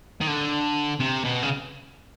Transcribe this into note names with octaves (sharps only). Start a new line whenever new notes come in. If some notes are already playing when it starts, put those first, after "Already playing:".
D#3
D3
C3
B2
C#3